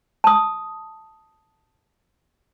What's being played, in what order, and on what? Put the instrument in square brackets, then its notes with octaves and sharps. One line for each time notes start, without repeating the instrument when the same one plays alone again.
[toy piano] A5 D#6